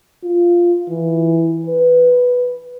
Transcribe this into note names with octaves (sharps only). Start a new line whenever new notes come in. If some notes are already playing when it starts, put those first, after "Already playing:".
F4
E3
B4